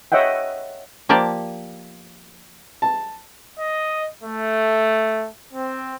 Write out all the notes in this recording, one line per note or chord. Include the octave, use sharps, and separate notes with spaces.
C#5 D#5 E5 F#5 G5
F3 A#3 G4 D5 A5
A5
D#5
A3
C4